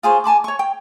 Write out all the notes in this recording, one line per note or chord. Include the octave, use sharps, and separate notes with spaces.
F4 G#4 C5 C#5
G#5 A5 B5 D6
C#5 C#6
G5